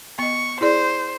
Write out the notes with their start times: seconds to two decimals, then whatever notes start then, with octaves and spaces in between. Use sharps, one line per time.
0.19 B3 D#5 C#6
0.61 E4 G#4 C5 D5